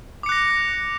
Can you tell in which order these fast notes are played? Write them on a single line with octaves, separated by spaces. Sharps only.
D6 C#7 F#6 A#6